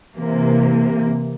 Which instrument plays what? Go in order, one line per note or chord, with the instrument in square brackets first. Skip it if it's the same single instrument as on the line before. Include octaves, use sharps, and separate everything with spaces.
[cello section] C3 E3 A#3